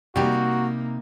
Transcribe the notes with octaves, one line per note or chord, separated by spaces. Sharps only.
C3 G3 A#3 D#4 F#4 G4